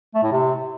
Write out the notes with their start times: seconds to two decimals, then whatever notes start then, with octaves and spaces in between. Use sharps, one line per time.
0.14 A3
0.23 A2
0.32 C3